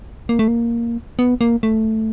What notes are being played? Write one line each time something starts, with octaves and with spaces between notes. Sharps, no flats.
A#3
A3
A#3
B3
A#3
A3